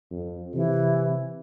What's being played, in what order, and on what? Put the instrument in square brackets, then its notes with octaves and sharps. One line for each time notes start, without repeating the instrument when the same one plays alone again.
[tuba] F2
[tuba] C3 [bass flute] E3